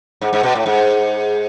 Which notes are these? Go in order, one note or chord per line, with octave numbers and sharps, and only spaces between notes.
G#2
G#2
B2
A2
G#2